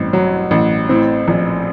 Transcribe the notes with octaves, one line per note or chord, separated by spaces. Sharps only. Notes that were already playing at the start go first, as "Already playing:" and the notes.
Already playing: A1 G2 C4
F#3
A1
A2 C4
A#1